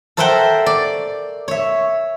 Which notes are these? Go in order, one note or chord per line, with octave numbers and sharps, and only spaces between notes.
A4 A#4 C5 E5 F#5 G5
D5
C#5 E5